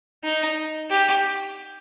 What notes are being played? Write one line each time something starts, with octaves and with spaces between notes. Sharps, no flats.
D#4
G4